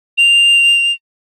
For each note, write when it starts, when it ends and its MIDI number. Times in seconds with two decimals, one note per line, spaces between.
0.18 0.92 101